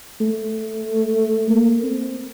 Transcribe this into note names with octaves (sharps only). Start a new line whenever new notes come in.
A3
A#3
C4